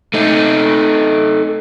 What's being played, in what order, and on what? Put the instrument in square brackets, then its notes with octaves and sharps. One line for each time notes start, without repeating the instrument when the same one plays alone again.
[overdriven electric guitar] A3 D#4